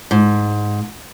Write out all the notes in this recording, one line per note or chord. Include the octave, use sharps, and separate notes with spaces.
G#2